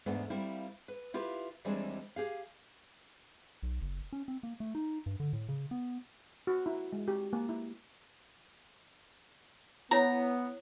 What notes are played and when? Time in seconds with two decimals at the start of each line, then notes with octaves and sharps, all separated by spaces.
0.06 E2 G#2 A3 B3 D4
0.30 G3 A#3 C4 E4
0.88 B4
1.14 E4 F4 G4 B4
1.65 D#2 E3 G3 G#3 C4 D4
2.16 G4 G#4 F5
3.63 B1
3.81 F#1
4.12 C#4
4.28 C4
4.43 A#3
4.60 A3
4.75 D#4
5.06 G2
5.20 D3
5.33 A2
5.48 C#3
5.71 B3
6.47 F#4
6.66 E4
6.93 G#3
7.08 G4
7.33 A#3
7.49 E4
9.91 B3 E4 C#5 G5 A#5